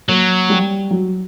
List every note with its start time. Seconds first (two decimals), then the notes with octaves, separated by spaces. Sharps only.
0.09 F#3 A#3
0.49 G3
0.90 F#3